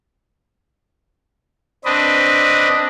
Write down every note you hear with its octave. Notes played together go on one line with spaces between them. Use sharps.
C4 D4 B4 D#5